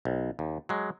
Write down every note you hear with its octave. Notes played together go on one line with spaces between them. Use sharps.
B1
D#2
F#3 G#3